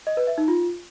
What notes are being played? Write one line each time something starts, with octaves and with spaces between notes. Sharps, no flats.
D#5
B4
E5
D#4
F4